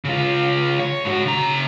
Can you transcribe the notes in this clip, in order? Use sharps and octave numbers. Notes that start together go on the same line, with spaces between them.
C#3 F4
C#5
G#2 F#4
C#3 A#5